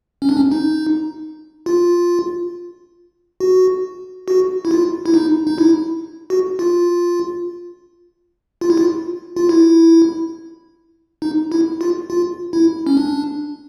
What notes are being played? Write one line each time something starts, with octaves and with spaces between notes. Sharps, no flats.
C#4
D4
C#4
D#4
F4
F#4
F#4
E4
F4
E4
D#4
D#4
E4
F#4
F4
F4
E4
F4
F4
E4
D#4
E4
F4
F4
E4
C#4
D4